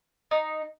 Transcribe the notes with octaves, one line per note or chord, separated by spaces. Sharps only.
D#4